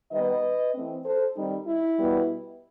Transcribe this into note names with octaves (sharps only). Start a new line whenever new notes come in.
D#3 G3 B3 B4 D#5
E3 A3 C4
A4 C5
D#3 G3 C4 D#4
E4
B2 G3 B3